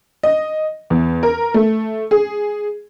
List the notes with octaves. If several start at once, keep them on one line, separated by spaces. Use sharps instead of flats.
D#5
E2
A#4
A3
G#4